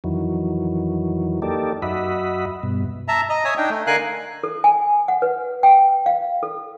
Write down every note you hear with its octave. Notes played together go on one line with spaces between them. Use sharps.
F2 D#3 E3 F#3
A#3 D#4 G4 A4 D5
F#2 F#4 D#5 E5 B5
G2 B2
E5 A5 A#5
D#5 A#5
C#5 E5 G#5 D#6
D4 D#4 G5
A3
D3 A#4 F5 G#5 F#6
A4
G#5
F#5
B4
G5
F5
A4